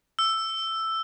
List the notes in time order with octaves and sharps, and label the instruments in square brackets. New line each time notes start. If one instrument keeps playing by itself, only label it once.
[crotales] E6